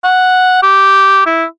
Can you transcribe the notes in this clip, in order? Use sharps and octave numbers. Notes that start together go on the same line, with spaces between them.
F#5
G4
E4